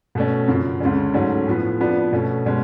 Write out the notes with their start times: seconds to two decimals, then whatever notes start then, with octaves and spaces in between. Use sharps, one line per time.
0.15 B2 A3 C#4
0.48 F#2 C#3 F3
0.80 D2 C#3 G#3 C#4
1.14 G#2 F#3 A3 C#4
1.47 A2 F3 B3
1.80 F2 F3 B3 D4
2.12 B2 A3 C#4
2.46 B2 G#3 C#4